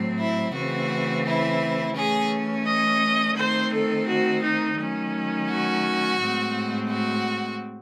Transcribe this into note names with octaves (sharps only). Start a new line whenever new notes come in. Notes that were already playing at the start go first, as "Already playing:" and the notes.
Already playing: A2 F#3 C4
E4
C#3 E3 A3 C4 F#4
E4
E3 A3 C#4 G#4
D#5
D#3 A3 C4 C5
A4
F#4
D#4
D#3 F#3 A3 C#4
F#4
A2 G#3 C4
F#4